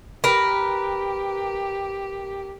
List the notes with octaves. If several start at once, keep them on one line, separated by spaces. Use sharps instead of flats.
G4 A#4 B4